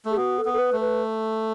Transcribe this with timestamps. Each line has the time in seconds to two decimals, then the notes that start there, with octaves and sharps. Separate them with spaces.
0.05 A3
0.11 G#4
0.17 B3 F#4
0.38 A4
0.45 B3
0.53 A4
0.58 B4
0.73 A3
0.80 B4